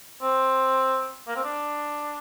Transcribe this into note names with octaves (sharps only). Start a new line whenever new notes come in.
C4
A#3
C4
D4